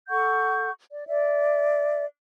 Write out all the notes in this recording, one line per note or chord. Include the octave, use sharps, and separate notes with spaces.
A4 F#5 C#6 G6
D5
D5 E5